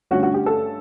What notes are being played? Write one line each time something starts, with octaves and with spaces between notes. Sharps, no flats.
G2 D3 A3 C#4 F#4
F#4
G4
A4